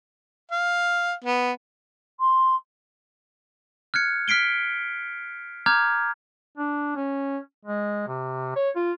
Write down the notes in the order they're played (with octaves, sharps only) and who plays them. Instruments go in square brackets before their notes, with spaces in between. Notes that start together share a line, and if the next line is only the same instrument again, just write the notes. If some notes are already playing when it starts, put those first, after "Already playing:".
[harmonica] F5
B3
[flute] C6
[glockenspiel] F6 F#6 G#6 C#7
F6 B6 C7 D7 G7
A#5 D6 F6 G6 G#6
[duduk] D4
C#4
G#3
C3
C#5
F4